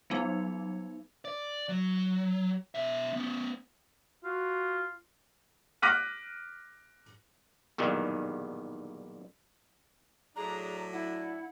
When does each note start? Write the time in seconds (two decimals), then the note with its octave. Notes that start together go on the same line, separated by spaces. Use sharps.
0.10 F#3 G3 B3 D#4
1.25 D5
1.69 F#3
2.75 B2 E5
3.13 B3 C#4
4.24 F4 F#4
5.82 D6 F6 F#6 A#6 B6 D#7
7.78 B1 E2 G2 A#2 D#3
10.36 A2 F#3 D4 G#4 A#5
10.93 E4 F#5